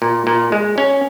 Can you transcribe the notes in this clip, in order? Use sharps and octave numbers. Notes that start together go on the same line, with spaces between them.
A#2
A#2
G#3
C#4